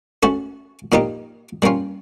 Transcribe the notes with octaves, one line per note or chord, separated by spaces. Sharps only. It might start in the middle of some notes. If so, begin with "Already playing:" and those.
A3 C#4 F#4 A4
A#2 F3 A#3 D#4 G4
G3 A#3 C#4 F4